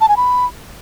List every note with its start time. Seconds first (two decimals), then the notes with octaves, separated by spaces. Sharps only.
0.01 A5
0.09 G#5
0.17 B5